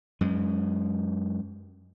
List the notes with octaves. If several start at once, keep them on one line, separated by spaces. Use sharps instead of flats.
F#2 G#3